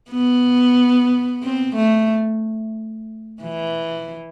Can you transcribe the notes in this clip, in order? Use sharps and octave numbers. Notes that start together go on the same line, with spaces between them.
B3
C4
A3
E3